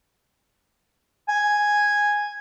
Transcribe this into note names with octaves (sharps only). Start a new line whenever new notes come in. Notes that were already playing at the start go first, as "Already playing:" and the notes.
G#5